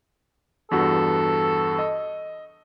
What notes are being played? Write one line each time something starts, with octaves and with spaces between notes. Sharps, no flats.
E2 G2 F#4 A4
D#5